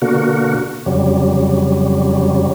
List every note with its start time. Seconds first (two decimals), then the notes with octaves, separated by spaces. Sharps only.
0.02 B2 D3 A#3 F#4
0.86 F2 C#3 F#3 G3